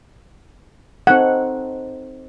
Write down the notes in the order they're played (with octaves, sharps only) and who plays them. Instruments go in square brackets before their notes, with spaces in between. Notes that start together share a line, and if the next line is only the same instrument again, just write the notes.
[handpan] C4 D#4 A4 [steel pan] F#5